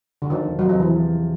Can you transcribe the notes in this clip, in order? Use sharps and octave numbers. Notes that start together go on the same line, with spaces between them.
D3
D#3 F3
E1
C3 F#3
F3
E2 E3
F3